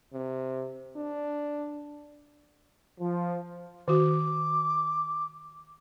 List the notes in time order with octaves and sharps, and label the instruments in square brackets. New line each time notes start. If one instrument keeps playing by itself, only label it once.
[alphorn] C3
D4
[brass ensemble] F3
[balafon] D#3 F#4 [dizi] D6